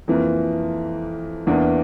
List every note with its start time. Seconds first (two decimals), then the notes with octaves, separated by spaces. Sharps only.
0.08 F2 E3 A#3
1.47 E2 E3 A#3 D4